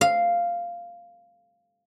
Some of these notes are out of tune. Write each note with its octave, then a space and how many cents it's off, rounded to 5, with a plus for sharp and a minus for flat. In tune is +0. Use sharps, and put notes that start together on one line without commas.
F5 -5